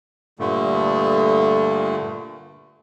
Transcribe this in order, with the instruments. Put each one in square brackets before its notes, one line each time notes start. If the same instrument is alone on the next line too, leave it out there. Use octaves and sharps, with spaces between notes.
[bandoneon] G2 A#2 D3 A3